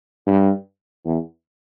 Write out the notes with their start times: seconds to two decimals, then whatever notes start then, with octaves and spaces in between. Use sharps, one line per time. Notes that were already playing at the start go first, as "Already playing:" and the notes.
0.27 G2
1.05 E2